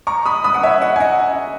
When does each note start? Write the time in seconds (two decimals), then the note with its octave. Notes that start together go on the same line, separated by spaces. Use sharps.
0.07 A#5 C#6
0.26 B5 D#6
0.44 B5 D#6
0.54 F#5
0.63 C#5 E5
0.82 D#5 F#5
0.96 G#5
1.00 D#5 F#5